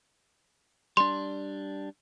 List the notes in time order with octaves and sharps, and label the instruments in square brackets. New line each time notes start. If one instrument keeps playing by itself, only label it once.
[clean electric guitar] G3 D4 [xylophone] C6